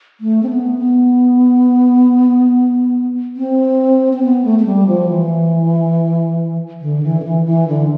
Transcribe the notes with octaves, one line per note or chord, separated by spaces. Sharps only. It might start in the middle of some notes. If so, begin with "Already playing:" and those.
A3
C4
B3
B3
C4
C4
B3
A3
A3
G3
F3
E3
D3
E3
D3
E3
E3
D3